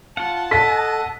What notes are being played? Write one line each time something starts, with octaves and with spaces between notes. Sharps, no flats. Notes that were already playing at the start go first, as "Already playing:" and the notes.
F4 F#5 A5
A4 D#5 F#5 F#6 B6